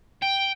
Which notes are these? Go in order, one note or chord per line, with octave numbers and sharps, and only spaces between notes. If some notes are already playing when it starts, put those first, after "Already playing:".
G5